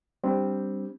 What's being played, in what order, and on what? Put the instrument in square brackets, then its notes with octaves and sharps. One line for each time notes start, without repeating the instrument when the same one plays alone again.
[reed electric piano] G3 C4 D4